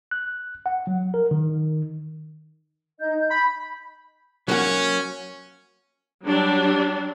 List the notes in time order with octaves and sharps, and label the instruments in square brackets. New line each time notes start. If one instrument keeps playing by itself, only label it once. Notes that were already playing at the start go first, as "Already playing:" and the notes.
[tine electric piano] F#6
F#5
F#3
A#4
D#3
[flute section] D#4 D#5 G6
G6
[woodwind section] B5
[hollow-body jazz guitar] F#3 A#3 F#4 [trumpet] C#4
[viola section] F#3 G3 D4